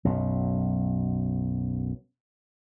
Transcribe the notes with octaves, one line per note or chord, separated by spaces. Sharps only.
B1 F#2